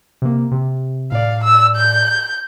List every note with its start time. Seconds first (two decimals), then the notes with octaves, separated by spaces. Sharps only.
0.22 C3 A#3
0.52 C3
1.12 A2 D5 F5
1.44 E6
1.76 G6